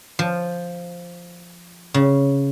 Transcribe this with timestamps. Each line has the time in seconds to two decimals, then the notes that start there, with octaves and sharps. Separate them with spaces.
0.19 F3
1.94 C#3